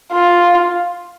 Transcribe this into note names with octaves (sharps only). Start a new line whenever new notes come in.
F4